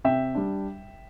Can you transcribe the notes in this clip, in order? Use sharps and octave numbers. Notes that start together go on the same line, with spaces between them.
C3 E5 G5
G3 D4